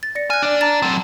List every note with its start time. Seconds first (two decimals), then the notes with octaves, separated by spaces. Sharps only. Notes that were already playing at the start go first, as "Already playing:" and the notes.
0.03 A6
0.15 D5 A#6 C#7
0.30 G#5 F6 F#6
0.42 D4 D5
0.61 A5 A#5 A6
0.82 F#3 C4